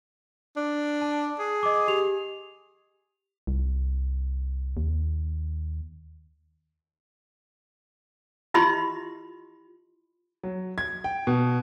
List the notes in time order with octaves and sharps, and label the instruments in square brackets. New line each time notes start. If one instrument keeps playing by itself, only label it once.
[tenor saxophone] D4
[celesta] A5
[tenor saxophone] G#4
[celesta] D#5 D6
G4 F7
[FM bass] C2
D#2
[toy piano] E4 F4 G4 D#5 B5 C6
[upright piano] F#3
G#6
G5
B2